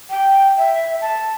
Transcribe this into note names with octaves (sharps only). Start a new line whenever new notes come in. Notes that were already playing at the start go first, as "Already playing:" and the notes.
G5
E5
A5